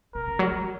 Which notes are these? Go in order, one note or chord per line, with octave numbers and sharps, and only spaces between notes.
B2 A#4
C#3
F#3
G#3